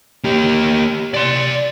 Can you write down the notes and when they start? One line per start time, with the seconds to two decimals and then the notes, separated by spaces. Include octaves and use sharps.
0.24 A#3 G4
1.14 D5 C6